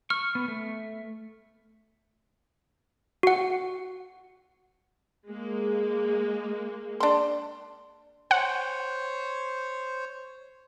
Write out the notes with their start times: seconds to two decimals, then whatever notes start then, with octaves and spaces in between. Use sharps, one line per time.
0.10 C#6 F6
0.35 B3
0.48 A3
3.23 F#4 F#5
5.28 G#3 A#3
7.00 D4 C6
8.31 C5 C#5 F#5